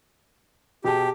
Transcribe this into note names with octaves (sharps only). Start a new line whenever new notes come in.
B2 G4 G#4 A5